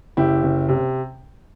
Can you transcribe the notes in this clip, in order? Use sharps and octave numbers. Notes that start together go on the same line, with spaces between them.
F#1 E4 G4
F#1
C3